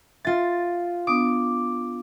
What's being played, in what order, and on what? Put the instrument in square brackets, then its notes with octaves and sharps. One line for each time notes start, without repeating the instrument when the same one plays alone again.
[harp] F4 A6 [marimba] E5
[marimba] B3 D4 D#6 [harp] D6